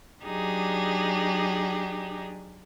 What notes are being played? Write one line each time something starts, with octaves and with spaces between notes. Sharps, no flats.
F#3 D4 D#4 G4 G#4